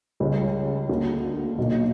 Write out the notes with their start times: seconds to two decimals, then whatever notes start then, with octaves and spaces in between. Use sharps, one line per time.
0.20 C#2 C#3 G3 C#4
0.89 D2 D3 A#3
1.58 B1 A#2 A#3